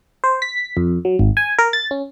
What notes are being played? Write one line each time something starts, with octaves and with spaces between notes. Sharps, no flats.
C5
B6
F2
F#3
G#1
G#5
A#4
A6
C#4